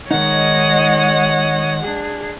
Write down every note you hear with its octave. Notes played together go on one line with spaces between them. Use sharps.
D#3 G#3 D#4 C#5 D#5 F#5
D4 G#4